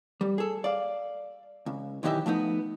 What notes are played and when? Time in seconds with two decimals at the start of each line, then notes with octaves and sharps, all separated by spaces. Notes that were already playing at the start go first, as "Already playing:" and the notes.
0.21 G3
0.38 G#4 A4
0.64 D5 F5
1.66 C#2
2.03 B1 D#3 E3 G4 D#5 E5
2.26 F3 A3 B3 D#4